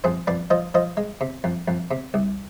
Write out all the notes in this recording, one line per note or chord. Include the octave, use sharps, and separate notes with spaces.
F2 G#4 C5
F2 B4 D5
F3 C5 D#5
F3 C5 D#5
G#3
C3
F2
F2
C3
C2